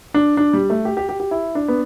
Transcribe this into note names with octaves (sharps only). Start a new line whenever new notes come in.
D4
D4
G3
A3
G4
G4
G4
G4
E4
D4
B3